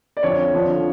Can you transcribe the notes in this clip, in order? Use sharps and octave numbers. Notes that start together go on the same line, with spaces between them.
D5
F2 D3 F3 C#5
F2 D3 F3